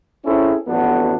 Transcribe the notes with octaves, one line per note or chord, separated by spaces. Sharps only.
C4 C#4 E4 G#4 A4
A1 F2 B3 D4 F#4